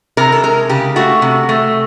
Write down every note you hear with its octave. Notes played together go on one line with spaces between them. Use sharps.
C3 A#4
A4
G#3 A#4
C#3 G4
A3 F#4
C3
A3